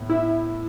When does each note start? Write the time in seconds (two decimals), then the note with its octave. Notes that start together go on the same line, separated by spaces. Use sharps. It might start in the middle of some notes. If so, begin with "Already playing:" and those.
Already playing: A2 B3
0.10 E4